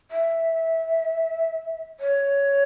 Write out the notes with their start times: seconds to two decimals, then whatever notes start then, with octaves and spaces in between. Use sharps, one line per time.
0.11 E5
2.00 C#5